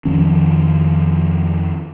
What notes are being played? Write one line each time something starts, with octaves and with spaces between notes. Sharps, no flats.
F2 D#3 F3 C#4